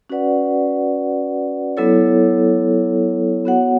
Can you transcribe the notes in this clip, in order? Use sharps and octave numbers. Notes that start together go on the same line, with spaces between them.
C#4 F#4 B4 D5 F#5
F#3 B3 E4 A4 C#5
B3 F#4 C#5 F#5